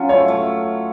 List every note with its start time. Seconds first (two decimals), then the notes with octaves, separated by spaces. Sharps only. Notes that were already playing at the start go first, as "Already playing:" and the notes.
Already playing: F#3 C#4 F4
0.09 A3 C#5
0.28 A3